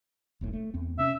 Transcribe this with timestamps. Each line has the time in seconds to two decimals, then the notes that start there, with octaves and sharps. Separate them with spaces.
0.41 E1 B1 A2
0.53 A3
0.74 E2 C4
0.98 C3 C#4 E5